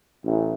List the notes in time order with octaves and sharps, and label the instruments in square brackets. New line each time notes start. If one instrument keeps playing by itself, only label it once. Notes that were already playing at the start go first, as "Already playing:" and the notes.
[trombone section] A1